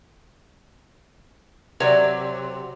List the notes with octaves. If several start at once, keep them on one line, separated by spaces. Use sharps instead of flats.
C3 F#3 C#5 D5